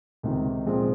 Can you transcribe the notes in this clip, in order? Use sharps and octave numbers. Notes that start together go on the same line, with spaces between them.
C#2 C3 D#3
A#2 F3 G#3 C4